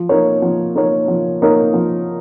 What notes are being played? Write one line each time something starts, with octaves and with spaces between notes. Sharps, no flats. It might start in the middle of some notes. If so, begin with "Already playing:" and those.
Already playing: F3
A#3 D#4 A#4 C#5
F3
A#3 D#4 A#4 C#5
F3
A#3 D#4 A#4 C#5
F3